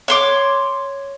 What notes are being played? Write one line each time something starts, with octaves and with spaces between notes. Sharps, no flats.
C#5 C6 D6